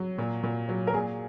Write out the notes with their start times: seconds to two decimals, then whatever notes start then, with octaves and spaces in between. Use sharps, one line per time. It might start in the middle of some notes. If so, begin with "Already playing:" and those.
Already playing: F#3
0.18 A#2
0.43 A#2
0.69 F#3
0.87 A#4
0.94 A#2 G#4